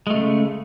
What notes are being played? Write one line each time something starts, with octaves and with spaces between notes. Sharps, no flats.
C#3 G#3 A3